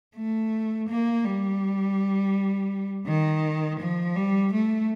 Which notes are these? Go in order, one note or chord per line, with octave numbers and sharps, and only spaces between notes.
A3
A#3
G3
D#3
F3
G3
A3